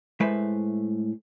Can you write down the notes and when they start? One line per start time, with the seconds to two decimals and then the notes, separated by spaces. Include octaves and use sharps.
0.20 A2 G#3 A3 B4 C5 E5